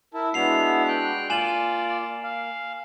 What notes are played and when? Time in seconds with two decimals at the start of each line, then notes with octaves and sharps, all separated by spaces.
0.14 E4 A#4 A5
0.34 G#3 B3 D4 E4 F#4 C7 F7
0.88 G5 F#6
1.30 A#3 F4 D5 G#5 E7 F#7
2.23 F5